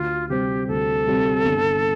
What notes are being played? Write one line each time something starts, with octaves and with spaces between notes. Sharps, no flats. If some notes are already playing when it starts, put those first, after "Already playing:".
Already playing: D2 F4
C3 G3 C4 G4
D2 A4
C3 G3 C4
G1